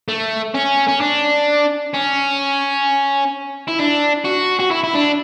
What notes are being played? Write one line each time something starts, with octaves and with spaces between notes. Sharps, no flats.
A3
C#4
C#4
D4
C#4
E4
D4
F#4
F#4
E4
E4
D4